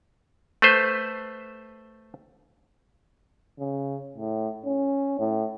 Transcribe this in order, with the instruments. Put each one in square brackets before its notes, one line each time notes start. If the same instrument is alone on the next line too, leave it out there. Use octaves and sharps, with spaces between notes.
[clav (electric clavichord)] A3 B4 C5
[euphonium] C#3
A2
C#4
A2